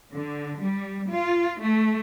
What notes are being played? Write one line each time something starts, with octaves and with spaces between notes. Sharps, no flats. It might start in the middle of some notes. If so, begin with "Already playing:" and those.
D3
G3
F4
A3